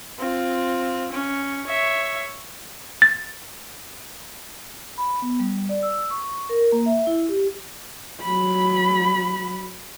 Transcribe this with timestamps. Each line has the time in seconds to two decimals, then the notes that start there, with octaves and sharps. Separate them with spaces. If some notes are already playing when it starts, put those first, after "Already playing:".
0.19 C4 F4
1.12 C#4
1.67 C#5 E5
3.02 A6
4.98 B5
5.22 B3
5.39 G3
5.69 D5
5.83 E6
6.10 C#6
6.49 A#4
6.72 A#3
6.86 E5
7.07 E4
7.29 G4
8.22 F#3 B5